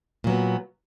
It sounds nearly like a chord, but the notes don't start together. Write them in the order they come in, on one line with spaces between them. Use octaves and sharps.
A#2 F#3 B3